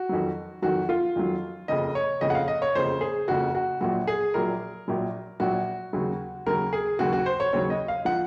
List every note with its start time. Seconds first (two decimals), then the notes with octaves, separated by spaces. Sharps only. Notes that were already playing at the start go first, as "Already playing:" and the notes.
Already playing: F#4
0.09 F2 D#3 F#3
0.62 F2 D#3 F#3 F#4
0.89 F4
1.16 F2 D#3 F#3
1.68 F#1 F2 C#3 D#5
1.95 C#5
2.21 F#1 F2 C#3 D#5
2.30 F#5
2.35 F5
2.48 D#5
2.62 C#5
2.75 F#1 F2 C#3 C5
3.01 G#4
3.28 F#1 F2 C#3 F#4
3.55 F#4
3.81 A#1 A#2 F#3 F#4
4.07 G#4
4.34 A#1 A#2 F#3 A#4
4.88 A#1 A#2 F#3
5.40 A#1 A#2 F#3 F#4
5.93 D#2 C#3 F#3
6.46 D#2 C#3 F#3 A#4
6.73 G#4
6.99 D#2 C#3 F#3 F#4
7.12 F#4
7.26 C5
7.40 C#5
7.53 D#2 C#3 F#3 C#5
7.70 D#5
7.88 F5
8.05 F3 F#5